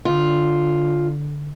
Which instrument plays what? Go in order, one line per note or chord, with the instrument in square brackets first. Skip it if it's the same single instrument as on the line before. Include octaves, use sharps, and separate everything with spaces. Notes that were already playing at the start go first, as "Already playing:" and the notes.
[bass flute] D3 [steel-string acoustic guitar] F4